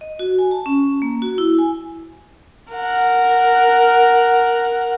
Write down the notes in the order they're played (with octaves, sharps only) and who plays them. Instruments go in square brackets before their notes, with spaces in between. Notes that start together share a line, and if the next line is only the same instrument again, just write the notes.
[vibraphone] D#5
F#4
G#5
A5
C#4
A#3
F#4
E4
G#5
[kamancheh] A#4 F#5